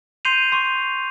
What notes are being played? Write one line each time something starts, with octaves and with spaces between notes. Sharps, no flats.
C6 G6 C7 D#7 F7
C6 C#6